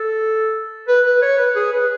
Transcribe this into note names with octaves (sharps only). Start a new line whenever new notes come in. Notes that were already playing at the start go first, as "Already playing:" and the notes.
Already playing: A4
B4
B4
C#5
B4
G#4
B4